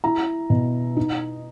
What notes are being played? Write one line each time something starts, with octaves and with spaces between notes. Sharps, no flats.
E4 A#5
B2
D#4